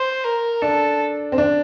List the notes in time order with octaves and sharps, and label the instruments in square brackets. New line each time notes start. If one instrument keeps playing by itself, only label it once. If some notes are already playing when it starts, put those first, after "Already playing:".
Already playing: [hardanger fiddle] C5
A#4
[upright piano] D4 [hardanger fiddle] A4
[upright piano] C4
D4